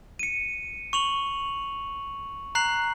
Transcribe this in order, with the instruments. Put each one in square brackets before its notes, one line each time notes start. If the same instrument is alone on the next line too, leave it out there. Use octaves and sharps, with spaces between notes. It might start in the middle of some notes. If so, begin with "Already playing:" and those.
[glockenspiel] C#7 D#7
C#6 F7 F#7
A#5 F#6 C7 F#7